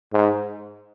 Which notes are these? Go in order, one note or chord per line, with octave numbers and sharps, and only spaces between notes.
G#2